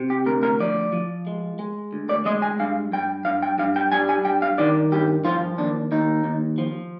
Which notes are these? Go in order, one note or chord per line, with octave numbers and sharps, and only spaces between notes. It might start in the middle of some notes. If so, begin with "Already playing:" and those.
Already playing: C3
G4
D2 A#4
A#4
F3 D5
F3
G#3
G#3
D2
D5
G#3 D#5
G#5
G2 F5
G2 G5
G2 F5
G5
G2 F5
G5
G3 G#5
G#5
G2 G5
F5
D#3 D5
G2 G4
F3 F4
D#2 D4
D#2 D#4
D#2
F3